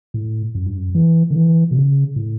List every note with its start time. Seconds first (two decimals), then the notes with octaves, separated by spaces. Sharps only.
0.14 A2
0.55 F#2
0.67 G2
0.78 F#2
0.95 E3
1.30 D3
1.36 E3
1.71 B2
1.76 C#3
2.16 A2